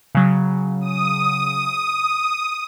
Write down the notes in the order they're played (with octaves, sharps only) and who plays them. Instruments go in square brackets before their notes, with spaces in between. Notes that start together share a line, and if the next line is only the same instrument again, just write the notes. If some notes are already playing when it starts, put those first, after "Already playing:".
[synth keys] C#3 F#3
[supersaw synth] D#6